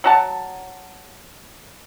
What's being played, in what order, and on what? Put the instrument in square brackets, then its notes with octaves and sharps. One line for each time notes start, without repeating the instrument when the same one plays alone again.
[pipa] F#3 F#4 A5